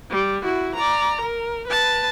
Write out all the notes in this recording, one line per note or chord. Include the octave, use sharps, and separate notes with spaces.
G3
E4 F#4
D5 A#5
A#4
B4 A5